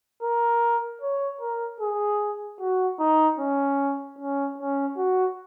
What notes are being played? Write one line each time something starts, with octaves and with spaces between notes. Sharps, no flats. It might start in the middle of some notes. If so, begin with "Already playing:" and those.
A#4
C#5
A#4
G#4
F#4
D#4
C#4
C#4
C#4
F#4